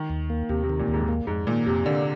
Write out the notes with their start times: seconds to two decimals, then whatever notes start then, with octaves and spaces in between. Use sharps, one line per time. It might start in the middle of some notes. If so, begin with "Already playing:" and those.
Already playing: D#3
0.10 D#2
0.30 A#3
0.49 D#2 C3
0.63 C3
0.70 D#3
0.79 A#2
0.88 D#2
0.94 G#2
1.08 A#3
1.27 F2 G#2
1.47 A#2 D#3
1.66 F2 C3
1.86 D3 A#3